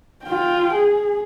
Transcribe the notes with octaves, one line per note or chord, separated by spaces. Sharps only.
F4 G5
G#4